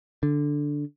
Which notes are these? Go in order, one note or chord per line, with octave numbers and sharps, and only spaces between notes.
D3